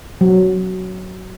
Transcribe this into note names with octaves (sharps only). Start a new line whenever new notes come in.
F#3